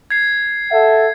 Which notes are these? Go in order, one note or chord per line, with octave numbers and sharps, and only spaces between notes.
G#6 C7
A4 E5 F#5